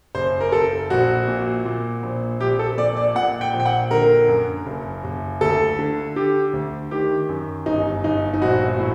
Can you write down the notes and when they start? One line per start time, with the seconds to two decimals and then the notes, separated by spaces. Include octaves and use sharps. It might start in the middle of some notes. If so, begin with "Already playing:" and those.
0.15 F#1 C5
0.41 A#4
0.52 F#1 A4
0.90 A#1 F#4
1.28 A#2
1.65 A#2
2.03 A#1
2.40 A#1 G4
2.59 A4
2.77 A#2 D5
2.97 D5
3.15 A#2 F#5
3.41 G5
3.53 A#1
3.60 G5
3.66 F#5
3.91 D3 A#4
4.28 F#2
4.66 F#1
5.04 F#1
5.41 D2 A4
5.79 D3
6.16 D3 G4
6.53 D2
6.91 D#3 G4
7.29 F#2
7.66 G1 D#4
8.04 G1 D#4
8.34 D#4
8.41 A#1 F#4
8.79 A2